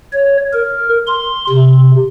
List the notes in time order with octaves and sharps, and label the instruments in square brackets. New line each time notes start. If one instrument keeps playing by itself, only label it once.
[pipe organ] C#5
A#4
C6
C3